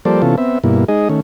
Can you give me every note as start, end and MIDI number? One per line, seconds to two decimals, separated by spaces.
0.05 0.22 53
0.05 0.22 55
0.05 0.22 58
0.05 0.22 69
0.05 0.22 72
0.05 0.22 74
0.22 0.36 48
0.22 0.36 52
0.22 0.36 59
0.22 0.36 61
0.22 0.36 65
0.22 0.36 69
0.38 0.59 59
0.38 0.59 60
0.38 0.59 76
0.64 0.84 43
0.64 0.84 47
0.64 0.84 58
0.64 0.84 64
0.88 1.08 56
0.88 1.08 63
0.88 1.08 68
0.88 1.08 75
1.09 1.20 51
1.09 1.20 57
1.09 1.20 61